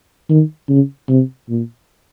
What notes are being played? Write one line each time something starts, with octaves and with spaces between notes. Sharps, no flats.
D#3
C#3
C3
A#2